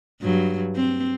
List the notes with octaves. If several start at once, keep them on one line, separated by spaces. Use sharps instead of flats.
G2 F#3
C4